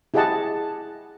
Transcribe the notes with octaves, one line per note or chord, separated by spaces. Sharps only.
E4 G4 G#4 D#5 F#5 A5